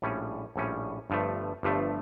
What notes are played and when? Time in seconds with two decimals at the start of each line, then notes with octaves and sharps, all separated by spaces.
0.02 A#1 A2 G3 C#4
0.56 A#1 A2 G3 C#4
1.10 G1 G2 F3 A3
1.63 G1 G2 F3 A3